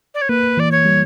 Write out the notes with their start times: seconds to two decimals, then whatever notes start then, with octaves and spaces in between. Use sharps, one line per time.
0.14 D5
0.22 C#5
0.29 A#3 B4
0.57 E3 D5
0.72 C#5
0.85 G3